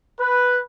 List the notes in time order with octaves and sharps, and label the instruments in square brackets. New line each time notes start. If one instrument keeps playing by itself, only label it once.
[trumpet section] B4